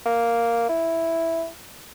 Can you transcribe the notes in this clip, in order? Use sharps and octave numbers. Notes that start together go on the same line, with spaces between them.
A#3
E4